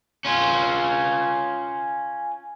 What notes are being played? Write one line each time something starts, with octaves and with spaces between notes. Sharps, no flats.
C#4 F4